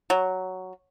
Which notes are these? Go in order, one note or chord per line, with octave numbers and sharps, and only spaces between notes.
F#3